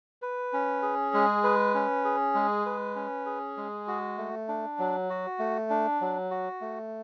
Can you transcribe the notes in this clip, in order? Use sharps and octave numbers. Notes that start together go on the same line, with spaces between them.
B4
C#4
G#4
G#3
B4
C#4
G#4
G#3
B4
C#4
G#4
G#3
F#4
A3
D4
F#3
F#4
A3
D4
F#3
F#4
A3